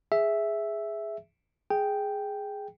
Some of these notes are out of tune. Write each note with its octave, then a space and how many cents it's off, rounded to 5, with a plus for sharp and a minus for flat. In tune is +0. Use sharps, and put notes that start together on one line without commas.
G#4 +0 E5 +0
G#4 +0 G5 +0